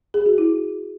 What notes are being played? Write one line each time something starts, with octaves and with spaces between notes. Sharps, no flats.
G#4
F#4
E4